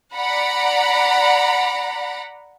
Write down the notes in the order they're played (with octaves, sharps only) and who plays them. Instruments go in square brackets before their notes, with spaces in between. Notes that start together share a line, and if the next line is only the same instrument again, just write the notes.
[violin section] D5 F#5 A#5 B5